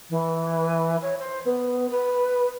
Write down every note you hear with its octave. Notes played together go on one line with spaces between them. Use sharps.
E3
C#5
C5
B3
B4